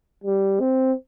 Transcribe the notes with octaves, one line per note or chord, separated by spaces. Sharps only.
G3
C4